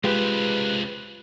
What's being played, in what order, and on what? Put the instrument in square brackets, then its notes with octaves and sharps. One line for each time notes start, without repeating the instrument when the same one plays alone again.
[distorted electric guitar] C#2 C3 [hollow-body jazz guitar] G#3 F4 G4 [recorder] B4